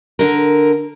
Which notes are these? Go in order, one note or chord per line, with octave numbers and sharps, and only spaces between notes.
D3 A#4